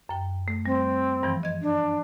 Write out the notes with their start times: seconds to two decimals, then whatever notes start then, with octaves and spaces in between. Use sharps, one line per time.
0.09 F#2 G5
0.48 A3
0.66 G3 C4
1.23 G2 E3 F3
1.43 D#5 G#6
1.61 D4